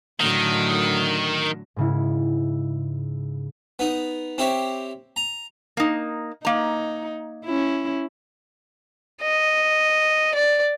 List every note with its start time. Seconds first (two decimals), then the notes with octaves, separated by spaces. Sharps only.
0.20 A2 D3 D#3 F#3
1.76 G#2 C#3 E4
3.79 B3 D#4
4.38 C4 E4 G4 C5 C#5
5.16 A#5
5.77 A#3 D#4
6.45 A#3 D#4 A#5
7.45 C#4 E4
9.22 D#5
10.34 D5